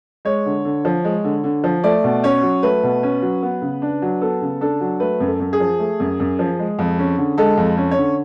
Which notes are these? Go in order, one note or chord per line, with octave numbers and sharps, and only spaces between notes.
G#3 C#5
D3
D3
F3
G#3
D3
D3
F3
A3 D5
B2
C#4 C#5
F#3
A3 B4
B2
C#4
F#3
B3
C#3
D4
F#3
B3 A4
C#3
D4 A4
F#3
A3 B4
F#2
A4
F#2
G#4
F3
A3
F#2
F#2
F3
G#3
F2
C#4
D3
G#3 A4
F2
C#4
C#5
D3